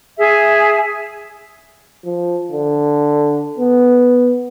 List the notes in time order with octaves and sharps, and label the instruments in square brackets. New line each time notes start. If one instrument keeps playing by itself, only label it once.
[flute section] G#4 E5 G#5
[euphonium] F3
D3
B3